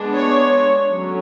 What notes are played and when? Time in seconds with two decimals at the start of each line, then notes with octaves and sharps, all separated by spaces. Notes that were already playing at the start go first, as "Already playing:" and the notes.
Already playing: G#3 B3 D4
0.13 C#5
0.89 D3 F#3 C#4